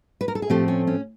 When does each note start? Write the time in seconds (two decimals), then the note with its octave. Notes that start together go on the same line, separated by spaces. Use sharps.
0.21 B4
0.28 A#4
0.35 A4
0.42 G#4
0.50 A2 F3 A3 C4 G4
0.68 C#4
0.87 C#4